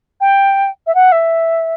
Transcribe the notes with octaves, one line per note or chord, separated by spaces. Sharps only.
G5
E5
F#5
E5